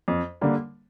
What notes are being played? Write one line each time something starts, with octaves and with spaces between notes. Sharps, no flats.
F2
D3 G3 A#3